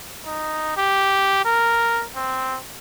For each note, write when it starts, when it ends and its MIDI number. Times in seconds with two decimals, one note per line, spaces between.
0.26 0.75 63
0.77 1.44 67
1.45 2.03 70
2.16 2.57 60